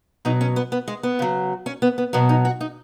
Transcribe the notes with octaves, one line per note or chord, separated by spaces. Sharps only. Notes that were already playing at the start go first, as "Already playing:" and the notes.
B2 F#3 D#4
C#4
B3
B3
G#3
B3
C#3 F#3
C#4
B3
B3
B2 F#3 B3
D#4
F#4
D#4